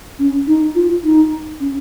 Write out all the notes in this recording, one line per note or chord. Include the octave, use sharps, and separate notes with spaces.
C#4
D#4
F4
D#4
C#4